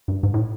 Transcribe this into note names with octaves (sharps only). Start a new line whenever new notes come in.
G2
G#2
A2